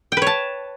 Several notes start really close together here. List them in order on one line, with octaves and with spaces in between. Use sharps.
G5 B4 C#5 A5